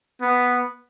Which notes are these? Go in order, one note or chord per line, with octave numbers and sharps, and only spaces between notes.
B3